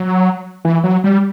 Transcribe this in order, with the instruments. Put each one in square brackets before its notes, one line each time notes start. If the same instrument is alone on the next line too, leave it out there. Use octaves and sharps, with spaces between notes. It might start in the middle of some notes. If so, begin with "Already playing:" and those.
Already playing: [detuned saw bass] F#3
E3
F#3
G3